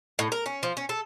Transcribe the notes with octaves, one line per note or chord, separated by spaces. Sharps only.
A2
A#4
C#4
F3
C#4
A4